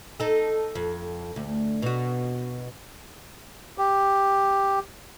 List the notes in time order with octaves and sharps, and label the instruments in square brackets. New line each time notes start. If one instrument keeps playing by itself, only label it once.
[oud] D#4 A4
F2
D2
B2 F#4
[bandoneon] G4